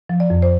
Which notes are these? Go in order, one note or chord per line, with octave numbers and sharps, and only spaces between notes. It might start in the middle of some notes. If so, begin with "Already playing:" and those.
F3
D5
F2
C5